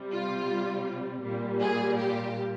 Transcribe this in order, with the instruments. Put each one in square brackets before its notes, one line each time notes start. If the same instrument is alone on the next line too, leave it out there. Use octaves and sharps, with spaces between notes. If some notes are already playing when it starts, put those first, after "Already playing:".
Already playing: [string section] C3 G3
F4
A#2 G3
G#4
G4